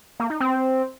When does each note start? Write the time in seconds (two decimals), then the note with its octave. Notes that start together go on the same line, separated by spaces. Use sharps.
0.20 A#3
0.30 D#4
0.40 C4